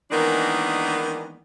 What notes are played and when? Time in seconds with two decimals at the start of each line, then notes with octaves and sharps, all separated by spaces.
0.11 D#3 E3 G#3 A#3 B3 D4